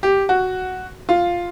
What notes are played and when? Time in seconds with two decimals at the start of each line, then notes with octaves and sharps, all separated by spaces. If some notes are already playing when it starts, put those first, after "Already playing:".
0.03 G4
0.29 F#4
1.09 F4